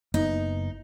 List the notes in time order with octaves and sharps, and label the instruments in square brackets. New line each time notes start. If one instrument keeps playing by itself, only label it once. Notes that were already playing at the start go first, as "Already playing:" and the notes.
[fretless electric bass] F#1 A#3 B3 [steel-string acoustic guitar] D#4